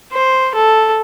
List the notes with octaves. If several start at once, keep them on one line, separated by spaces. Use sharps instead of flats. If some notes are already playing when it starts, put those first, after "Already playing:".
C5
A4